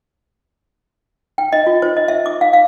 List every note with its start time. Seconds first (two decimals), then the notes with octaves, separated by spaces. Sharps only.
1.38 G5
1.53 D#5
1.67 F4
1.82 C5
1.97 D#5
2.08 E5
2.26 D6
2.41 F5
2.53 F5